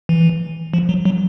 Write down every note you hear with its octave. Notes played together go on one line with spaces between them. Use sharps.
E3
F3
F#3
F#3